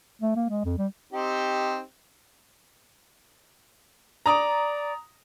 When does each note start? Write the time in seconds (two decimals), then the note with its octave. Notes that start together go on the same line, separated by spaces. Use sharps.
0.22 A3
0.36 A#3
0.49 G#3
0.65 F2
0.78 G3
1.13 C4 D#4 G4
4.26 D5 A#5 D#6